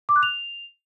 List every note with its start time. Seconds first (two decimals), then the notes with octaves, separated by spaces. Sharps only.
0.09 D6
0.16 F#6
0.23 F7